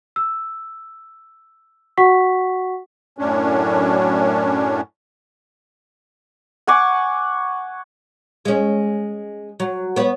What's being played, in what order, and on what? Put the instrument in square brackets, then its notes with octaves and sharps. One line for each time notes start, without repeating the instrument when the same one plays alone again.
[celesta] E6
F#4 F#5 C#6 B6
[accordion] F#2 A2 C#4 D4
[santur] F#5 G#5 C#6 D6
[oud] G#3 C#4
F#3
B3 C#5